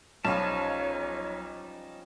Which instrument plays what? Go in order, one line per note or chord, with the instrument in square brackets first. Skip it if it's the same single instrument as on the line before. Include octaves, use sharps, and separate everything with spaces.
[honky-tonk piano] B1 F5 [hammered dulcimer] F3 G3 C#4 [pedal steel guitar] D#4 A5 [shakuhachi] C#5